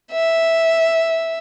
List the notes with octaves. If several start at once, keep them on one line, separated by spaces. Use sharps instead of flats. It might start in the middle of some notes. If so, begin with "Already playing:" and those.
E5